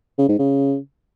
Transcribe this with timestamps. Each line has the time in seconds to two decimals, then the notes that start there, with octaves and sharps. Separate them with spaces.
0.18 C#3
0.29 G#2
0.39 C#3